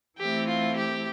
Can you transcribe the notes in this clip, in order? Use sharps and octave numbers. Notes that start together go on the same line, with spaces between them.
E3 A3 C4 E4 G4
F4
G4